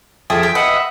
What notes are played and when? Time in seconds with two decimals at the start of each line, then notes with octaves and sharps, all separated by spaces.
0.30 F2 G#4 A4 E5 G5 D#6
0.43 G5
0.55 B4 D#5 E5 F#5